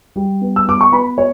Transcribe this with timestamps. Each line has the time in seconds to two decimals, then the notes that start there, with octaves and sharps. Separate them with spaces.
0.16 G3
0.41 B3
0.56 E6
0.67 B3 D6
0.81 C#6
0.92 B3 B4 B5
1.18 C#5